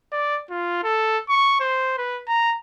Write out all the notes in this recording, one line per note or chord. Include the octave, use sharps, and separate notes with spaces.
D5
F4
A4
C#6
C5
B4
A#5